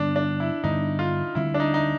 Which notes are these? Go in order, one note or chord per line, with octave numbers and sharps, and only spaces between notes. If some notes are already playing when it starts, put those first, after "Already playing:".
Already playing: G2 D3 G3 B3 D4
D4
E4
G2 D3 G3 B3 D#4
F4
D2 D3 G3 C4 E4
D4
D#4
D#4